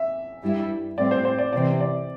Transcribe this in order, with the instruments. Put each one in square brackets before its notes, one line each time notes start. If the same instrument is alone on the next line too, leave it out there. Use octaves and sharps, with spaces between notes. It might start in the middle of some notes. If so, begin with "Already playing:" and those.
Already playing: [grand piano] E5
[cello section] G2 G3 E4
[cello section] A2 G3 C4 [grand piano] D5
[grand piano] C5
C5
D5
[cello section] C3 E3 C4 [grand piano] D5
[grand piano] D5